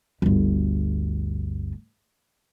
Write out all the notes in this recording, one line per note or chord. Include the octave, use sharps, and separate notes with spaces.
G1 D2